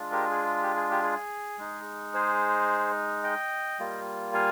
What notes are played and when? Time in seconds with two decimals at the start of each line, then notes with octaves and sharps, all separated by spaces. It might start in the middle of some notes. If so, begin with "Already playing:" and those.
Already playing: G#3 D4 F4
0.12 G4 A#4
0.31 G#4
0.63 G4
0.77 G#4
0.91 G4
1.04 G#4
1.58 G#3 D#4
2.14 G#4 C5
3.24 D#5 G5
3.79 G3 A#3 F4
4.34 F5 G#5